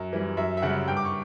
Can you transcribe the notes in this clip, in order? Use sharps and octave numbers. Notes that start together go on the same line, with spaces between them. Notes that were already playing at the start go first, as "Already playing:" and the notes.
Already playing: F#2
E3 G3
F#2 E5
E5
C#3 G3 F#5
G2 G5
D6
C#6